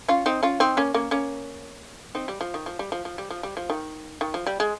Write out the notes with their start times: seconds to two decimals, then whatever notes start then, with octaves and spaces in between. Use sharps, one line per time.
0.08 C#4 F4
0.26 C4 D#4
0.43 C#4 F4
0.60 C4 D#4
0.77 A#3 C#4
0.94 A#3 C#4
1.11 A#3 C#4
2.15 C4 D#4
2.28 G3
2.41 F3
2.54 D#3
2.66 F3
2.79 G3
2.92 F3
3.05 F3
3.18 G3
3.31 F3
3.43 G3
3.57 F3
3.70 D#3
4.21 D#3
4.34 F3
4.47 G3
4.60 G#3